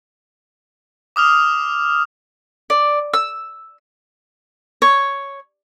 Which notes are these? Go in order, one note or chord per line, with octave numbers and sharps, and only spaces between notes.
D6 D#6 F6 F7
D5
E6
C#5